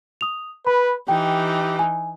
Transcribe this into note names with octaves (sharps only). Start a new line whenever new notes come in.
D#6 F7
B4 B5
E3 D#4 G4 G5
G#5